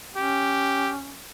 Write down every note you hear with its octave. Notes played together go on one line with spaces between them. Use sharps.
C#4 G4